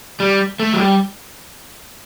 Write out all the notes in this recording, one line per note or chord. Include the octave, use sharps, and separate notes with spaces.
G3
A3
F#3
G3